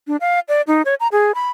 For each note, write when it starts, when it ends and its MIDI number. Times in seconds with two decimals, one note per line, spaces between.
0.07 0.16 62
0.21 0.40 77
0.49 0.62 74
0.67 0.82 63
0.85 0.95 73
1.00 1.08 82
1.12 1.32 68
1.35 1.50 83